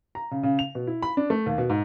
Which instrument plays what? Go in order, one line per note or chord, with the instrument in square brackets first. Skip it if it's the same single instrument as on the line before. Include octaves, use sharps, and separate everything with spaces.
[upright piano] A#5
C#3
C#3
F7
B2
E4
B5
D4
A3
D#2
B2
G#2